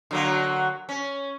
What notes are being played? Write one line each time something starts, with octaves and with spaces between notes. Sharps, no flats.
D3 F#3 A#3
C#4